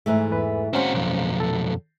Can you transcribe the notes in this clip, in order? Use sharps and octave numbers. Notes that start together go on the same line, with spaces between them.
G#2 E3 A3
E2 B4
G#3 A#3 C4 C#4 F#4 C5 F#5
B1 F2
A4